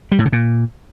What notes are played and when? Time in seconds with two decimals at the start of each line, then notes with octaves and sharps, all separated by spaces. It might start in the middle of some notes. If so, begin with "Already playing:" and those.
0.12 G3
0.19 A2
0.26 C#3
0.32 A#2